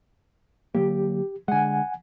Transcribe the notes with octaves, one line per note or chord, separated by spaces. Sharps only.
D3 F#3 A#3 G4
D3 G#3 F#5 G#5